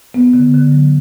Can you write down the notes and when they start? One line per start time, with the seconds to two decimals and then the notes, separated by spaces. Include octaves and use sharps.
0.14 B3
0.34 D3
0.54 D3
0.72 F#3